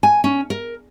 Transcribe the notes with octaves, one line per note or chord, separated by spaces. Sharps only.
G#5
C#4
A#4